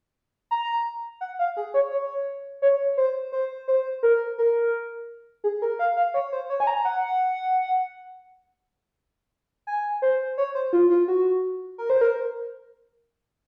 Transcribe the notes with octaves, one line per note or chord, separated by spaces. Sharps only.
A#5
F#5
F5
G#4
C#5
C#5
C#5
C5
C5
C5
A#4
A#4
G#4
A#4
F5
F5
C#5
C5
C#5
G#5
A#5
F#5
G#5
C5
C#5
C5
F4
F4
F#4
A#4
C5
A#4